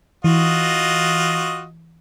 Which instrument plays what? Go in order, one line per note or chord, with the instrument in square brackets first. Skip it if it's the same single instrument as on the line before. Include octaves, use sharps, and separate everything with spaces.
[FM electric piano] E3 [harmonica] F4 F#4 D#5